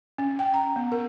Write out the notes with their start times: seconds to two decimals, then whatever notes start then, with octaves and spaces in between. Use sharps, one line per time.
0.18 C#4
0.39 G5
0.54 A#5
0.76 B3
0.92 A#4